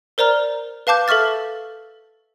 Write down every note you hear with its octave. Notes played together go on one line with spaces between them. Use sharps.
A#4 C5 D5 A#5 F6
B4 F5 A5 D6 G6
A4 E5 C#6 F6 A6